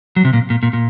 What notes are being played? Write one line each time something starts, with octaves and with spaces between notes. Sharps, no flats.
F#3
C3
A#2
A#2
A#2
A#2